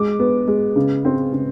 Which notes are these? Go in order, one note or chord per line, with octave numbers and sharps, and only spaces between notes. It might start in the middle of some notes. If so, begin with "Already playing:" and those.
Already playing: G#3 D6
B3
G#3
C#3
C4
C#3